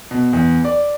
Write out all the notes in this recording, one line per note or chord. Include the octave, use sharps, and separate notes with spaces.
B2
E2
D5